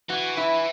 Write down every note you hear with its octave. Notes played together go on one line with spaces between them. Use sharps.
E3 F#4
E4